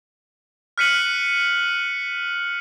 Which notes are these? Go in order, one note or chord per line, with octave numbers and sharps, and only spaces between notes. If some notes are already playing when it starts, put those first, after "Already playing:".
F6 F#6 B6 C#7 D#7 F#7